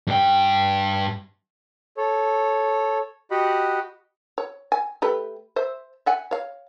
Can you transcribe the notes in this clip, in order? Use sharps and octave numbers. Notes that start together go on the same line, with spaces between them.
G2 G5
A4 C#5
F#4 G4 D#5 F#5 B5
C#5
G#5
A3 G4 B4
C5 E5
E5 F#5 G#5
C#5 F5